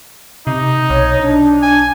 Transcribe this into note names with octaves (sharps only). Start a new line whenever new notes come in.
C3 D#4
B1 C#5
D4
G#5